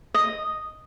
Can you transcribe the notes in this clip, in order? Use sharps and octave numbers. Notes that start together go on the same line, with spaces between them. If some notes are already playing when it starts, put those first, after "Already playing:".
D#5